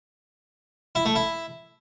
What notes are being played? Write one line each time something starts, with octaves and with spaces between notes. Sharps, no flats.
E4
A3
E4